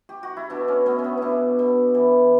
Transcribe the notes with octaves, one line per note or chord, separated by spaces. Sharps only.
G4
F#4
E4
B2 D4
C#4
B2 B3
C#4
B3
B2 D4 E4
B2
E3